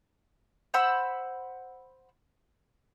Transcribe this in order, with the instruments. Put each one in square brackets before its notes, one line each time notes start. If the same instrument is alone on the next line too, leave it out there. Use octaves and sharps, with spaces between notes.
[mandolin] C5 F#5 B5 E6